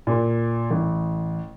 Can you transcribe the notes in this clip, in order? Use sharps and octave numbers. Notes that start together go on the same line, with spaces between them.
A#2
A1